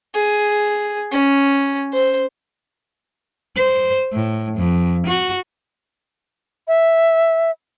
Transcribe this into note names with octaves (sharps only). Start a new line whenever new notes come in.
G#4
C#4
C5
C5
A2
F2
F#4
E5